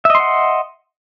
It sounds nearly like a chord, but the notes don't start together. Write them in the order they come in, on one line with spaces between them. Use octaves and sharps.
E5 D#5 C6 F#5